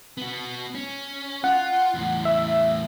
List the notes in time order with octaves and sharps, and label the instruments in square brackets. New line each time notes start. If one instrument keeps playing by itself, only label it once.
[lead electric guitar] B3 F#4
C#4
[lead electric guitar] F4 [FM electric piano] F#5
[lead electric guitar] E2 A2
[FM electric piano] E5